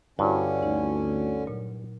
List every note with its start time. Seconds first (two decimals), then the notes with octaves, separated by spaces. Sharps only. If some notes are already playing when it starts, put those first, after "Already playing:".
0.19 G2 D3 C#4 E4 F#4 C5
0.63 D2 D#4
1.46 A#2 F#3